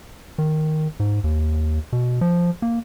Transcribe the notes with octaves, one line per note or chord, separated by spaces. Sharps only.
D#3
G#2
D#2
B2
F3
A#3